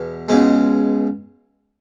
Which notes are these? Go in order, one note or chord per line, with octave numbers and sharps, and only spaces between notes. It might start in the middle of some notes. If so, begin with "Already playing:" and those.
Already playing: E2 B2
C#2 B2 G#3